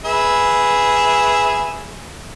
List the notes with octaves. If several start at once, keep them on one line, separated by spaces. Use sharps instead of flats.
G#4 B4 E5